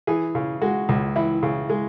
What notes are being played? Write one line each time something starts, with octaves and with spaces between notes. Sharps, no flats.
E3 G#4
C#3
G#3 F#4
C#2
E3 E4
C#3
G#3